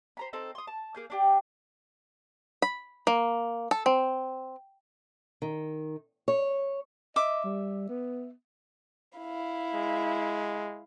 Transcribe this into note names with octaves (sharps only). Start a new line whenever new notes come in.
C5 A#5 B5
C4 D#4 A4 A#5
C6 D#6
A5
A#3 G#4 G6
D4 G4 G5
B5
A#3
A4
C4
D#3
C#5
D#5 E5 D6
G3
B3
E4 F5
G#3